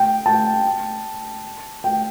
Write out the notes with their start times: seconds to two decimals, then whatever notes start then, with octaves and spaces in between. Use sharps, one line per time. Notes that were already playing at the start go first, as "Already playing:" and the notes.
Already playing: G5
0.26 A5
1.84 G5